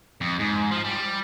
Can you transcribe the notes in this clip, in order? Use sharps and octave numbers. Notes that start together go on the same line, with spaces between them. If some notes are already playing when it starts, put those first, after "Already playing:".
F2
G#2
F3
G3